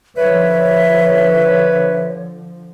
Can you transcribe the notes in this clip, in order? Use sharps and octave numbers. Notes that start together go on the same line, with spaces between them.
D3 F3 B4 C#5 E5